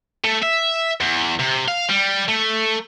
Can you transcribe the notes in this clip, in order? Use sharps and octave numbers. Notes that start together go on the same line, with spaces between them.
A3
E5
E2
C3
F5
G3
A3